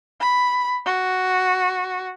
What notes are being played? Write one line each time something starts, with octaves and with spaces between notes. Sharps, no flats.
B5
F#4